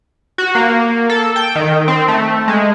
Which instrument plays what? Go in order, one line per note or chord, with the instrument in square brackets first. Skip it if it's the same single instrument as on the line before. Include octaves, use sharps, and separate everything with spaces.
[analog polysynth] F#4
A#3
A4
G5
D#3
C4
A3
G#3